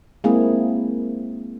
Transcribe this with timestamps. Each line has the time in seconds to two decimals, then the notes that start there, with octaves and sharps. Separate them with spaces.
0.24 G#3 A#3 C4 E4 G#4